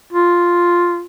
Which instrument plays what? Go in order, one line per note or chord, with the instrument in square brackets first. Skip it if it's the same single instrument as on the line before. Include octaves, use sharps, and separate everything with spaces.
[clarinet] F4